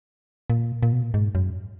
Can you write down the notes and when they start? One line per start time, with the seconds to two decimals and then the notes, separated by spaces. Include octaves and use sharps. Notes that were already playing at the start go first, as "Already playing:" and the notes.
0.50 A#2
0.83 A#2
0.92 B2
1.03 A#2
1.14 G#2
1.35 F#2